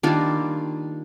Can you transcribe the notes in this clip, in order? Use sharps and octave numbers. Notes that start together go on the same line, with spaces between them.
D#3 G3 A#3 D4 F4